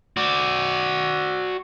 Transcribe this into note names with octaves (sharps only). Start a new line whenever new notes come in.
F#4 D5